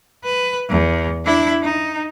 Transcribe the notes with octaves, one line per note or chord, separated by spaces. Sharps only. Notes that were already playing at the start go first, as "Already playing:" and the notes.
B4
E2
D4 E4
D#4